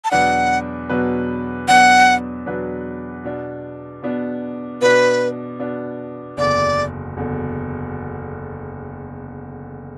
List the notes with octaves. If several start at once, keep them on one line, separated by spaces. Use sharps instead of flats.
A5
E2 B2 F#3 D4 B4 F#5
E2 B2 F#3 D4 B4
E2 B2 F#3 D4 B4 F#5
E2 B2 F#3 D4 B4
B2 B3 D4
B2 B3 D4
B2 B3 D4 B4
B2 B3 D4
F#1 E2 D3 D5
F#1 E2 D3